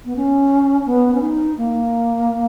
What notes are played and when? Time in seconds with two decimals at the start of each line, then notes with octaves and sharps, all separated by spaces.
0.05 B3
0.16 C#4
0.86 B3
1.14 C#4
1.21 D#4
1.58 A#3